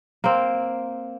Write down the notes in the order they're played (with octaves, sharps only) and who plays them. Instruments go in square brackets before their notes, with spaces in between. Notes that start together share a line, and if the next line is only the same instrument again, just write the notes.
[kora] A#3 C4